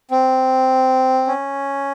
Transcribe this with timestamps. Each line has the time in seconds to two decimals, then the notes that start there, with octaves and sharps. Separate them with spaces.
0.11 C4
1.27 C#4